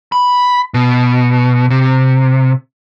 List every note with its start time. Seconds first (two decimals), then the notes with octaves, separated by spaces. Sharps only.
0.12 B5
0.74 B2
1.70 C3